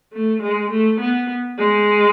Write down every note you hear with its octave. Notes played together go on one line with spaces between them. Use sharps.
A3
G#3
A3
B3
G#3